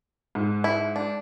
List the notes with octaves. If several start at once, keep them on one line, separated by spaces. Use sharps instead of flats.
G#2
E4
D4